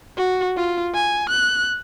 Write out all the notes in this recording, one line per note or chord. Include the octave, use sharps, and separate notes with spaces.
F#4
F4
G#5
F#6